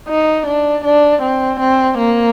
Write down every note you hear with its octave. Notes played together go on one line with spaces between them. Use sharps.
D#4
D4
D4
C4
C4
A#3